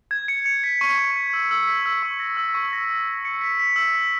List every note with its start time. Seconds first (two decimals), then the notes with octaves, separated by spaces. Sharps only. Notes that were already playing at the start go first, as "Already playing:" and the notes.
0.11 G#6
0.28 C#7
0.46 C#7
0.64 B6
0.81 C#6
0.98 C#6
1.16 B6
1.33 E6
1.51 E6
1.67 B6
1.86 E6
2.03 C#6
2.19 A#6
2.37 E6
2.55 C#6
2.73 A#6
2.89 A#6
3.07 A#6
3.25 C#7
3.41 B6
3.59 B6
3.76 E6
3.93 B6